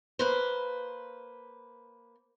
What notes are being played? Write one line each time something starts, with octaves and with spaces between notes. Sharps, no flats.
A#3 B4 C5